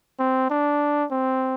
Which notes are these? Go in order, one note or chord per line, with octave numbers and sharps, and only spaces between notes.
C4
D4
C4